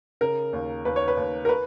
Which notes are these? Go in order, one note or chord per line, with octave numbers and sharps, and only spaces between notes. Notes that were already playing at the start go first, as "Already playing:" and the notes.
C#3 A#4
D#2
D#2 B4
C#5
B4
D#2
A#4
B4